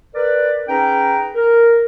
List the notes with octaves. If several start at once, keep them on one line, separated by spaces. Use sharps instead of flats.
A#4 B4 D5
C#4 D#4 G#4 B4 G5 A#5
A#4